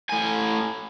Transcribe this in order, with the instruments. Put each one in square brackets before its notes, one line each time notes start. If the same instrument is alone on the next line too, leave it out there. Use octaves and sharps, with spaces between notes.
[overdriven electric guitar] A2 G#5